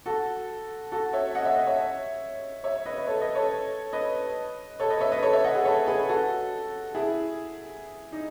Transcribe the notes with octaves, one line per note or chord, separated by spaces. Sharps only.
F#4 A4
F#4 A4
C#5 E5
D#5 F#5
C#5 E5
D#5 F#5
C#5 E5
C#5 E5
B4 D#5
D#5
A4 C#5
B4 D#5
A4 C#5
B4 D#5
A4 C#5
B4 D#5
C#5 E5
B4 D#5
A4 C#5
C#5 E5
D#5 F#5
G#4 B4
A4 C#5
G#4 B4
F#4 A4
E4 G#4
D#4